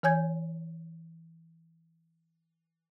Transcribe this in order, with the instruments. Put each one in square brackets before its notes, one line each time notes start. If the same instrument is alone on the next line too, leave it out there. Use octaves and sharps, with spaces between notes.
[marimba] E3 C#5 G#5 G6 G#6